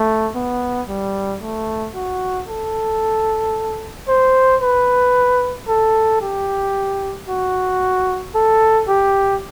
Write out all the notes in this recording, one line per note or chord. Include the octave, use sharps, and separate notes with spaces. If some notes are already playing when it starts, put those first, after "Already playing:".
Already playing: A3
B3
G3
A3
F#4
A4
C5
B4
A4
G4
F#4
A4
G4